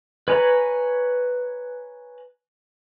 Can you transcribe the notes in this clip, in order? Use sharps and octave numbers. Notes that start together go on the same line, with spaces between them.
B4 C#5 G#5 A#5 B5